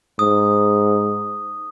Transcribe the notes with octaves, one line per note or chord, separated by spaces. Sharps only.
G#2 D#6